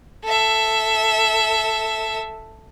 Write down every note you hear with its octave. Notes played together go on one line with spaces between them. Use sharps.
A4 E5